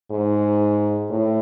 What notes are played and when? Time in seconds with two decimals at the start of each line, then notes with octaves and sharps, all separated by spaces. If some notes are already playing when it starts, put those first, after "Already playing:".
0.11 G#2
1.10 A2